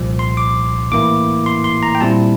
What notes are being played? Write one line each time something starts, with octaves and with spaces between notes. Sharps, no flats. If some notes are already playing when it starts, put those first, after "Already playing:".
Already playing: C2 A#2 F3
C6
D6
A2 E3 A#3 E4 D6
C6
C6
A#5
G5
A#2 G3 C4 E4 A5